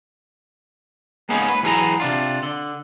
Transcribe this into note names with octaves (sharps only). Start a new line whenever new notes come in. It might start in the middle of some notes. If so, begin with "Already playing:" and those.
G#3 A#3 B3 C#4 D#4 G#4
B4
E3 F#3 G#4 B4 A#5
C3 D4 F4
D3